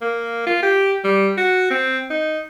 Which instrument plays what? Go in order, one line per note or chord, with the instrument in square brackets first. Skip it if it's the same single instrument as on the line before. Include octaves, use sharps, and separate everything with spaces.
[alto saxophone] A#3
F4
G4
G3
F#4
C4
D#4